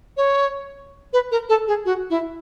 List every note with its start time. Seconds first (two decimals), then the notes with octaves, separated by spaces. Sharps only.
0.17 C#5
1.13 B4
1.31 A#4
1.49 A4
1.67 G#4
1.85 F#4
2.10 E4